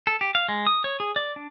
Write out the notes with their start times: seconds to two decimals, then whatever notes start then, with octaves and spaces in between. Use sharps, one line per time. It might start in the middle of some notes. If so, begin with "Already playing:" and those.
0.07 A4
0.21 G4
0.35 F5
0.49 G#3
0.67 D#6
0.84 C#5
1.00 G#4
1.16 D5
1.36 D4